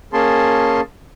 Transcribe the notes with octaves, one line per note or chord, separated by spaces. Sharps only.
A#3 C#4 G#4 A5 C6